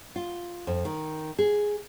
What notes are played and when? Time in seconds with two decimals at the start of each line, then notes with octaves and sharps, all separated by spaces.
0.16 F4
0.67 F2
0.85 D#3
1.39 G#4